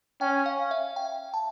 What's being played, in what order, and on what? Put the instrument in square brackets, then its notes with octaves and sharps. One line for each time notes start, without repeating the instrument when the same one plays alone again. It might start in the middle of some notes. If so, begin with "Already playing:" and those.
[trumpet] C#4 [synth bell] G5
[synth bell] F5
E5
G5
A5